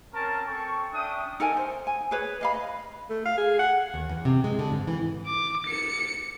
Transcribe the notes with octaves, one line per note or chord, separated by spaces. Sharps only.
C4 C#4 A#4 G#5 A5
C4 A4 G5 C#6
C#4 D4 E5 G5 D#6
D#4 A4 A#4 G#5
C5
G#5
G#4 B4 C#5
D#5 F5 B5
D#5
A3
F5
G#4
F#5
D#2
E2
C3
G#3
D3
G#2
E3
D6
C#7